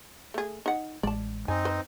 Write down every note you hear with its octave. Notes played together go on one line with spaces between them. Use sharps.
A3 G#4
D#4 F#5
A1 G#3 D5 A5
F#2 C4 D#4 G#5
B4 C5